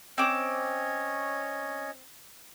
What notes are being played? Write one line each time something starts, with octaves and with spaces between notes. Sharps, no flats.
C4 C#4 C#5 D#5 D6